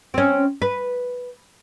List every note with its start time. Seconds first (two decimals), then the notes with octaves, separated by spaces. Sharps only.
0.14 C4 C#4
0.62 B4